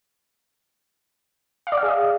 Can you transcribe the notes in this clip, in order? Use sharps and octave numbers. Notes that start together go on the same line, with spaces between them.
F5
D5
F5
G#4
D#5